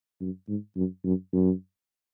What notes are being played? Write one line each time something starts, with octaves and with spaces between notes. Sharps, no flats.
F#2
G#2
F#2
F#2
F#2